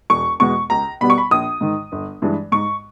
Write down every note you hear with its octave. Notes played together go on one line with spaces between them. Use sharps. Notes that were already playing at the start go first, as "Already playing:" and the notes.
E1 C#6
E2 B2 G#3 B3 C#6
C#2 A#5
B2 G3 B3 B5
C#6
B5
A#1 D#6
G#2 D#3
G1
G2 E3 G#3
G#2 C#6